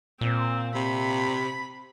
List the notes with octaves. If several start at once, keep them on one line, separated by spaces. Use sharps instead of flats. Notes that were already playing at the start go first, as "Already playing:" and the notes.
A#2 C4
C3 B5